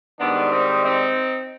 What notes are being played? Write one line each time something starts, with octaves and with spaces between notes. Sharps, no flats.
G#2 D#3 G3 B3 D4
C4 D#4
C4 D#4